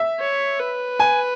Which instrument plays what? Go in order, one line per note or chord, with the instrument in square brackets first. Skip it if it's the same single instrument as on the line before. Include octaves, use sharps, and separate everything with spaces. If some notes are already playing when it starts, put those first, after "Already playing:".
Already playing: [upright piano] E5
[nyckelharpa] C#5
B4
[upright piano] G#5